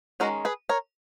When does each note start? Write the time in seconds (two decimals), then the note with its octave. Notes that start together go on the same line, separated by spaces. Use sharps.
0.20 D#3 G#3 C#4 F#4 A#4
0.45 G#4 B4
0.69 A#4 C#5